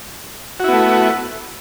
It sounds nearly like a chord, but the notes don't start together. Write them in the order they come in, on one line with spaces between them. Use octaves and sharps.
F#4 E4 B3 A3